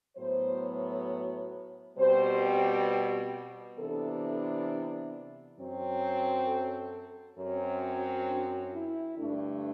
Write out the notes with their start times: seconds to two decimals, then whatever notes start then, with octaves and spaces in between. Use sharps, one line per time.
0.17 A2 F#3 B3 C5
1.97 B2 G3 C4 C5
3.78 C3 E3 B3 D4 A4
5.59 F#2 F#3 C4
6.48 A4
7.38 F#2 F#3 C4
8.28 D4
8.74 E4
9.18 G2 D3 A3 D4